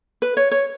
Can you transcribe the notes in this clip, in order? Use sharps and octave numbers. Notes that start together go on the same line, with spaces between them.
B4
C#5
C#5